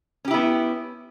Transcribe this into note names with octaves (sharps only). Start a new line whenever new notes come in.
B3 C#4 E4 G4